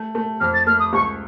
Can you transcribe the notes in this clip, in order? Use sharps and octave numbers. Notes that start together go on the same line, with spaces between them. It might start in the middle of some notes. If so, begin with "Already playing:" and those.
Already playing: A3
A3
F2 F6
A6
A3 F6
D#6
C#2 C#6